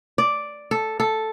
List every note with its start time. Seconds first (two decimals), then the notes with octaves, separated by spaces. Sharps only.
0.18 D5
0.71 A4
1.00 A4